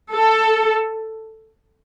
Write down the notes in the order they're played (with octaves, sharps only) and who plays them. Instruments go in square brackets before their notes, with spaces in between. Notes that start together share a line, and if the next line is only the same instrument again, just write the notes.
[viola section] A4